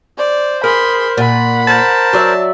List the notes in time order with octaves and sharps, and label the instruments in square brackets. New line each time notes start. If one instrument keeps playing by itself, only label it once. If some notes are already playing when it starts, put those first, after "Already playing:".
[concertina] C5 [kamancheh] D5
[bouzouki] G#4 [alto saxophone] A#4 [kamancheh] B5 C6
[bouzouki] A#2 [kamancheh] F#5 B5
[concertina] A#4 C5 [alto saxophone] A5
[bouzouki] F#3 D5 E5